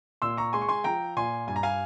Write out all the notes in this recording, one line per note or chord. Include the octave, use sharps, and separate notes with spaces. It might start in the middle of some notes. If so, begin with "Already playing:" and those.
A#2 C6 E6
A#5 C#6
G#3 G#5 C6
C#6
G#5 C6
F3 G5 A#5
A#2 G#5 C6
G2 G#5
A#5
F5 G#5